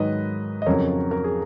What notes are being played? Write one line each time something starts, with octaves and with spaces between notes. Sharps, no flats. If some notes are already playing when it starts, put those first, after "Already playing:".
Already playing: G#2 D#3 F#3 B4 D#5
D#5
F2 C#3 F#3 A#4 C#5
A#4
G#4